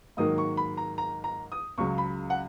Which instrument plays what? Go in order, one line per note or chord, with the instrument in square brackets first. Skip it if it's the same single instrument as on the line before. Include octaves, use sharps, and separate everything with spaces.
[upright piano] G#2 D#3 F#3 A#3 D#6
C#6
B5
A#5
A#5
A#5
D#6
C#2 C#3 F#3 C#6
B5
F#5